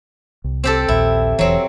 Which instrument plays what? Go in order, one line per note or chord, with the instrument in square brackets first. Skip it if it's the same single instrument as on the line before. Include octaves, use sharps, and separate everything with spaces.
[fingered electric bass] C2
[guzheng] C4 G4 A4
[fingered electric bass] A#1 D#2 A#2 [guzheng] E4
[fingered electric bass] E1 A#1 E3 [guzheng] F#3 C4